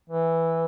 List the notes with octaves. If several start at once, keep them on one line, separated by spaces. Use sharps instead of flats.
E3